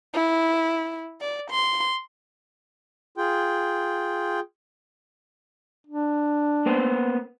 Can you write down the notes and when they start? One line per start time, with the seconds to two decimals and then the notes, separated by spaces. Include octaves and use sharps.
0.14 E4
1.21 D5
1.50 C6
3.18 F4 G#4 G5
5.87 D4
6.66 A#3 B3 C5